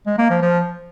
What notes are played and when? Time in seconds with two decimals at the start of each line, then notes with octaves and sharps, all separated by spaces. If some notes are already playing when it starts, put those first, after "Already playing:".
0.06 G#3
0.18 A#3
0.30 F3
0.42 F3